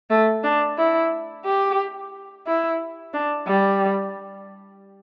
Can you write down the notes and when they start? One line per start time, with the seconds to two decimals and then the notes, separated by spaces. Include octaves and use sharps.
0.10 A3
0.44 D4
0.78 E4
1.45 G4
2.47 E4
3.14 D4
3.48 G3